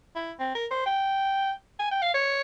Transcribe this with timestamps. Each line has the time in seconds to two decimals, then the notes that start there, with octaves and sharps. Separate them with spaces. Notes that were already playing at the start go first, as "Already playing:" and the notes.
0.15 E4
0.39 C4
0.55 A#4
0.71 C5
0.86 G5
1.79 G#5
1.91 G5
2.02 F5
2.14 C#5